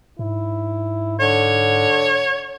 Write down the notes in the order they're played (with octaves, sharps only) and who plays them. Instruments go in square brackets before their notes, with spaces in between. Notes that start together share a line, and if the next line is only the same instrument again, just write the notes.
[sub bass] G#2 [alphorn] E4
[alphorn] D3 [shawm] C#5